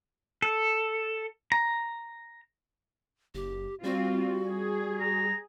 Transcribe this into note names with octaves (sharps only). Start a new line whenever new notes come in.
A4
A#5
F#1 G4
G3 C4 F4 F#4
G#4
A#5